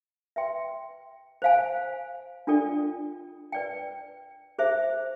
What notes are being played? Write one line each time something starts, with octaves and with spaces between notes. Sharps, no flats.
B4 E5 G5 C6
C5 F5 G#5
D4 F4 A4 D5 G5
B4 D5 G5
G#4 C5 E5